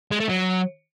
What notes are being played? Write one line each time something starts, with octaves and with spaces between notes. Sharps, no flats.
G#3
A3
F#3